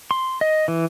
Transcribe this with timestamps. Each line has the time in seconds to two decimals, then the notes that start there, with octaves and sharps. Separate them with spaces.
0.11 C6
0.41 D#5
0.68 E3